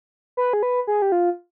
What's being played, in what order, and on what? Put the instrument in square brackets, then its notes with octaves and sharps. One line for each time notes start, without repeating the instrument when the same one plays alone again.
[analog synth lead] B4
G#4
B4
G#4
G4
F4